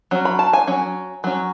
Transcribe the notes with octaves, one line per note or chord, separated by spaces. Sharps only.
F#3 C#4
B5
A5
G#5
F#3 C#4
F#3 C#4